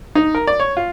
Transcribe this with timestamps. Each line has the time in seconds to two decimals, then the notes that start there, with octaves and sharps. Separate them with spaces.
0.15 D#4
0.35 A#4
0.47 D5
0.60 C#5
0.77 F4